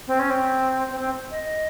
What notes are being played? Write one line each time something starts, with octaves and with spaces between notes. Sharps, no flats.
C4
C#4
C4
C4
C4
D#5